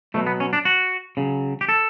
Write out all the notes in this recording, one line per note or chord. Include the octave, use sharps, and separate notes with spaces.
B2 F#3 A3
B3
C#4
D4
F#4
C#3 F#3
G4
A4